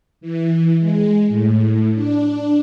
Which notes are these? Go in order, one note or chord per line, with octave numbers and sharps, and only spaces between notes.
E3
G#3
A2
D4